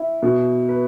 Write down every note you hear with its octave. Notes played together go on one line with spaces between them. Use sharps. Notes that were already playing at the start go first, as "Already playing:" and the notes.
Already playing: E4
B2
B4